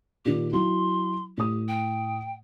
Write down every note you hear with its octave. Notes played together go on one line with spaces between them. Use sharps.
A#2 D#3 G4
F#3 E4 C6
A2 G4 D#6
G5